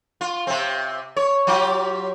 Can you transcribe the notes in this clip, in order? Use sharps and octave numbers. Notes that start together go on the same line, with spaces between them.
F4
C3 C4
C#5
F#3 F4 G4